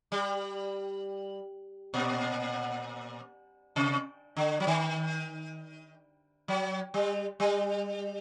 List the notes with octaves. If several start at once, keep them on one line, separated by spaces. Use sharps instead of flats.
G3
A#2
C3
D3
F#3
D#3
F#3
G3
G3